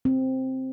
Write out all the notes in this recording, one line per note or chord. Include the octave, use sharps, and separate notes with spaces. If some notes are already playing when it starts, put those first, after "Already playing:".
C4